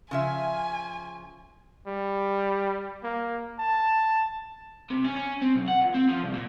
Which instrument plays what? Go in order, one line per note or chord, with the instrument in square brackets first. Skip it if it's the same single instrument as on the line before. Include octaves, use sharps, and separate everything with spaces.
[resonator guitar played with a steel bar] C#3 F3 E5 [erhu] G#5
[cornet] G3
A#3
A5
[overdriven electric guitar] C3
C#4
C#4
C4
B1
F#5
A#2
C4
F3
C2
A#2